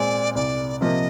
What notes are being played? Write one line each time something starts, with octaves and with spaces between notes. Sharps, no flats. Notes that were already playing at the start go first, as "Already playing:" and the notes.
Already playing: A#2 G#3 C4 D5
C2 D5
C3 F3 A#3 D#5